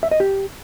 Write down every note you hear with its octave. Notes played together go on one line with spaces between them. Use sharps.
E5
D#5
G4